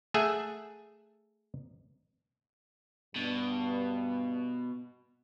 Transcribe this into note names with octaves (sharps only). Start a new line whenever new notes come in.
A3 G#4 E5 F#5 G#5
G2 B2